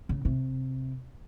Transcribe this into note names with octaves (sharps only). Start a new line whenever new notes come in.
C#3
C3